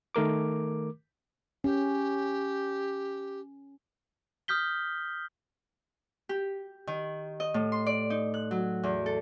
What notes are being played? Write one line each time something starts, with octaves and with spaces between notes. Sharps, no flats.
D#3 A3 A#4 D6
C#4 G4
D#6 F6 G6 B6 G7
G4
D#3
D#5
A2
C6
D5
D#4
F#6
F#3
E2
A4